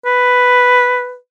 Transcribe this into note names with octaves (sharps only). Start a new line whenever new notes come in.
B4